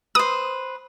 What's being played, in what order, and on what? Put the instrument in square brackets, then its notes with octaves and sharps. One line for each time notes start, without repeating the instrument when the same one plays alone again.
[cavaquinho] B4 C5 [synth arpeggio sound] D#6